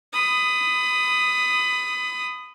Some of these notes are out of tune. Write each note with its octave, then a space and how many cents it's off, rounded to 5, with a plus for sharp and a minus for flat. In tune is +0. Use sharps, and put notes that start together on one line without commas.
B5 +25 D#6 +0